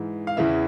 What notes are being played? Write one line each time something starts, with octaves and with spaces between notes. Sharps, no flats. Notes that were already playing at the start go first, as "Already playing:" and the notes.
Already playing: G#2 E3
F5
E2 C#3 E3 E5